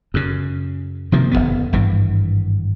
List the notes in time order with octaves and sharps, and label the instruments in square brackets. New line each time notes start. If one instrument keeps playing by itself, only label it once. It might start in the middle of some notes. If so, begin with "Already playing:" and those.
[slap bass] F#2 C#3
C3 D#3 F3 A#3
D1 C#2 F#2 B3
G#1 G2 E3